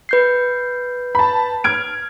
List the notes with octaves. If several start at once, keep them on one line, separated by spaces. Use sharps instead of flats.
B4 G6 C7
A5 B5
F6 G#6 D7